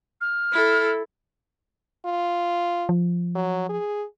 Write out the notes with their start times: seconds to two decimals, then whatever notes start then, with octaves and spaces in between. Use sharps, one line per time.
0.21 F6
0.52 E4 A4
2.06 F4
2.89 F3
3.35 F#3
3.69 G#4